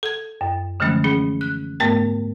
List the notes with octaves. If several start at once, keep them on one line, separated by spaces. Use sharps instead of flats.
A4 G#6
F#2
D3 E3 F3 G#3 A3 C#4
C#4 G#4
F#6
G#2 A3 B3 A#4 G5